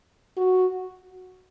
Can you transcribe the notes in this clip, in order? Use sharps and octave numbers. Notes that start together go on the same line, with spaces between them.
F#4